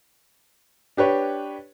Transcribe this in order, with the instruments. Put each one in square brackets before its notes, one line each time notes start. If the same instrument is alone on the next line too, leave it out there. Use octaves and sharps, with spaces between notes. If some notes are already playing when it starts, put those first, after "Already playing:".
[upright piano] D4 G4 B4 C#5